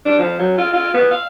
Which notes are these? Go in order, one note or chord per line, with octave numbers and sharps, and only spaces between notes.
D4
F3
F#3
F4
F4
B3
F5